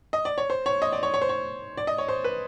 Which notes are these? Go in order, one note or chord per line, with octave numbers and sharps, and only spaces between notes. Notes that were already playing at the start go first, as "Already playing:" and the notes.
D#5
D5
C#5
C5
C#5
D#5
D5
C#5
C#5
C5
C#5
D5
D#5
C#5
C5
B4